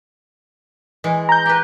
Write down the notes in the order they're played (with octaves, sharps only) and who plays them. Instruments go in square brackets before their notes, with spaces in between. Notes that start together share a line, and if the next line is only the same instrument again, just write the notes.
[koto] E3 G#3
[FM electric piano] A#5 G6
[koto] G4 B4